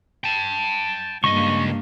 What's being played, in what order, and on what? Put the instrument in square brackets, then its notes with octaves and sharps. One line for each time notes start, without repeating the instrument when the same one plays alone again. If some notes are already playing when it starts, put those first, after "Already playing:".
[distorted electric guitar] G5 A5
[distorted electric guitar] C#2 D#5 [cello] G2 A#3 [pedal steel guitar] C#6